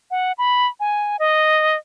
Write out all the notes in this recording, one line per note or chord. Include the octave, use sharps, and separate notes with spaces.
F#5
B5
G#5
D#5